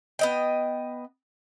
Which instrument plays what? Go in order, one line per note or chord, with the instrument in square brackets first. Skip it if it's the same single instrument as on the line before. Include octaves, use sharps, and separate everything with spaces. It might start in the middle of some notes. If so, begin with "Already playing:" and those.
[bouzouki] B3 D#5 G5